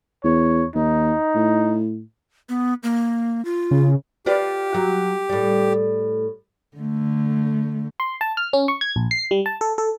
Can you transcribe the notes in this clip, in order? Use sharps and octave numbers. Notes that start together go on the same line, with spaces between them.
E2 C#5
D#2 D#4
A2
B3
A#3
F4
C#3
F4 G4 B4 D5
F#3
A2 G3
D3 A3
C6
A5
F6
C#4
C#6
G#6
A#1
C7
G3
A5
A4
A4